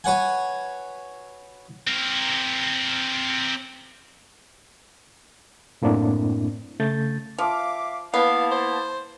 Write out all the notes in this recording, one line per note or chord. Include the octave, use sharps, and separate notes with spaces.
F#4 B4 C#5 F#5 G#5
C4 A#4
F#2 A2 A#3 C4 D4 E4
C#3 A3 G6 A6
F3 E5 F5 D6
A#3 B3 E4 F5 A5
C5